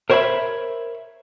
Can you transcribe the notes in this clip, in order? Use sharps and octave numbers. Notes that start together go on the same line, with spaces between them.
A#4 C5 C#5 D#5 E5 B5